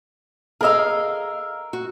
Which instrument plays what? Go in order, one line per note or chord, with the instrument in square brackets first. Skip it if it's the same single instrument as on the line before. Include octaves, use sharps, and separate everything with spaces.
[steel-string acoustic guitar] G#4 D#5 F5 [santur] A#4 E6
[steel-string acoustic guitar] F#4